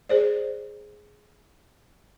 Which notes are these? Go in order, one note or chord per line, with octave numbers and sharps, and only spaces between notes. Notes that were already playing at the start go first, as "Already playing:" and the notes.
G#4 C5 D5